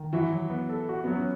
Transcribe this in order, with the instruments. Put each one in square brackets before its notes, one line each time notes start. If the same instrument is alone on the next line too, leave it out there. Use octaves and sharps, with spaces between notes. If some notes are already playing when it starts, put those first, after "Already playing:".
Already playing: [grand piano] D#3
[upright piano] E3 E4 [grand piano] F#4
[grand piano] F#3
B3
A4
F#4
[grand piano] F#3 [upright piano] B3
[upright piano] C#4